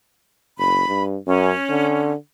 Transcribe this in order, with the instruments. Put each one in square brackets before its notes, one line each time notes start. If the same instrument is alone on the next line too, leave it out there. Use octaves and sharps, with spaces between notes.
[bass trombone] F#1 [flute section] B5
[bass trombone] G2
[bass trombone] F#2 [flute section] C#4
[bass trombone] D3